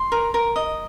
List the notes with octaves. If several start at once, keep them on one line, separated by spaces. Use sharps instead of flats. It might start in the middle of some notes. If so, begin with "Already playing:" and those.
Already playing: C6
A#4
A#4
D#5